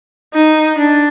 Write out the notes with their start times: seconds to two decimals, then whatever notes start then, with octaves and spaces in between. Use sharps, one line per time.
0.34 D#4
0.78 D4